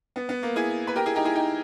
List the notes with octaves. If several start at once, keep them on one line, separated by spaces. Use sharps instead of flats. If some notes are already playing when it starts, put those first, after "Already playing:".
B3
B3
A#3
E4 G#4
B4
G4 A#4
E4 G#4
D#4 G4
E4 G#4
D#4 G4